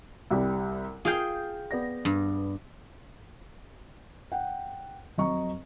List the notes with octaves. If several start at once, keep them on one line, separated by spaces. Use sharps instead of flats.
C2 G3 G4
F4 G#4 F5 G5 G6
B3 D5 A#6
G2
F#5 G5
F2 F#3 D#5 A#5 C#6